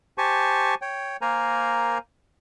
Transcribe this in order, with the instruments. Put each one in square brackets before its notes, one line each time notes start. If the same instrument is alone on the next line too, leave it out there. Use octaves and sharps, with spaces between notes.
[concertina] G4 C5 G#5 A5 C#6
C#5 G5
A#3 A#4 C5 G#5 A#5